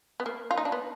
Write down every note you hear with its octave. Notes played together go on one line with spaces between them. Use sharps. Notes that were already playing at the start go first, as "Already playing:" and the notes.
B3
A#3
F4
D#4
D4
B3